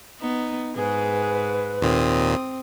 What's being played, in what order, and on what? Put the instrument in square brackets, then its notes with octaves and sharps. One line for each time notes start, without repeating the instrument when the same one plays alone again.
[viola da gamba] B3 [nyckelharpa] D#4
[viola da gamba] G#2 [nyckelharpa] G#4 [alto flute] B4
[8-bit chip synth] D#2 A#2 [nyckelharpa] C4 D#6